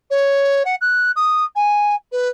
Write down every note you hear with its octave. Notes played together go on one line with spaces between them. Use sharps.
C#5
F#5
F#6
D#6
G#5
B4